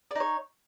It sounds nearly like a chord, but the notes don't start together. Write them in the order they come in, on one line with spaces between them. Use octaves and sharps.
D5 D#4 C#5